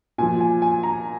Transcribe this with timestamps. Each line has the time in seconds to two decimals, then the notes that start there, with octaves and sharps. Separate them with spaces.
0.18 A#2 F3 G#5
0.40 G#5
0.62 G#5
0.83 A#5